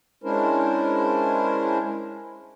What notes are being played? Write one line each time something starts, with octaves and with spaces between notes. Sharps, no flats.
G#3 C#4 D4 E4 A#4 C5